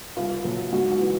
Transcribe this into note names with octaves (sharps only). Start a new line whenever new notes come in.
C2 F4
A#2 F#3
G#2 F#4
F#4
E3